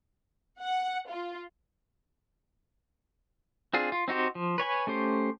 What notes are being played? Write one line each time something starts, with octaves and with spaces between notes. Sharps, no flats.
F#5
F4
C4 D4 F4 G#4
F4
C4 D#4 F#4 G4 C5
F3
B4 C#5 G#5 B5
A3 C#4 G4 C5